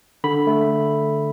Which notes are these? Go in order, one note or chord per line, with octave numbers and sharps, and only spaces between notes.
D3 B5
A3